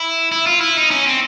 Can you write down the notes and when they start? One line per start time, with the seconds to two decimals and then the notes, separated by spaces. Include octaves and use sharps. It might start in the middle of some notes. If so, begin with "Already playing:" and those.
Already playing: E4
0.32 E4
0.46 F4
0.61 E4
0.76 D#4
0.91 C#4
1.06 C4